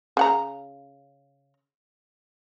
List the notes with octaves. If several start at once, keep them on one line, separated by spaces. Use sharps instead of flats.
C#3 F#5 A#5